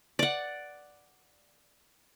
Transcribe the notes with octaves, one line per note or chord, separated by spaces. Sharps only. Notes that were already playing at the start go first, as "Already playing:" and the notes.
D5 F#5